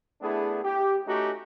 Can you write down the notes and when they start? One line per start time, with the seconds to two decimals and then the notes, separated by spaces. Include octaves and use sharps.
0.21 A3 B3 D4 E4 G#4
0.63 G4
1.06 A3 C#4 D#4 F#4 G4